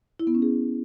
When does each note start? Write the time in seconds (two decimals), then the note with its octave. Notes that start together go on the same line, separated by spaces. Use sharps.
0.20 E4
0.27 B3
0.35 C#4
0.42 G#4